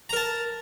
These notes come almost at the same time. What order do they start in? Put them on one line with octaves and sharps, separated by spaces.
A#5 A#4 A5